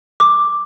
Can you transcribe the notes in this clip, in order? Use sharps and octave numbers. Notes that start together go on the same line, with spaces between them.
D6